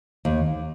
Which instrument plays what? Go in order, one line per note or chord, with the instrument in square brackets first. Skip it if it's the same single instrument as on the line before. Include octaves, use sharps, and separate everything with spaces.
[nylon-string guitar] D#2